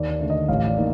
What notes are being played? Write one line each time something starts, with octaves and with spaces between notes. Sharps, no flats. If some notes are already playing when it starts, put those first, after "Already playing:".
Already playing: D#2 D5
D5
D3 A3
D#5
A1 F5
D5
A#3 D#4